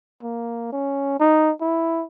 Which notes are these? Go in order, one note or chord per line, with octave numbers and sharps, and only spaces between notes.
A#3
C#4
D#4
E4